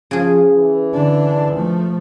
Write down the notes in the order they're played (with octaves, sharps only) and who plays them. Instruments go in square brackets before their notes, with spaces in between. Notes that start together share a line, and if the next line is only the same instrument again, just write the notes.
[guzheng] C#3 G#4 [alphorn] F3
[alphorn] E3
[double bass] D3 D4
F3 A3